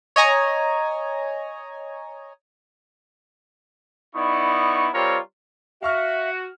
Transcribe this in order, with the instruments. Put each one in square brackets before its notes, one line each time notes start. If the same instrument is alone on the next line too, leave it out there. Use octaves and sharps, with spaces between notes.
[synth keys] C#5 D#5 G#5 A#5
[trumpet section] B3 D#4 E4 D5 C#6
G3 C4 F4 A#4 C#5 A#5
[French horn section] F#4 [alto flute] E5 [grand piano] F5 C#6 F6